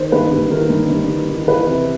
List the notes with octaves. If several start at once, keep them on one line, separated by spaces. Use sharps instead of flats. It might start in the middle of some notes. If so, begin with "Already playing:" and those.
Already playing: D#3 C5
G2 B4
G2
D#3 A#4
G2
G2
D#3
D#3
E3 B4
C3